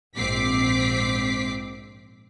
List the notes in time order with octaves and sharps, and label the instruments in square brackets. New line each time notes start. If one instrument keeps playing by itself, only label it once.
[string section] A#1 G#2 C4 D6 B6 C7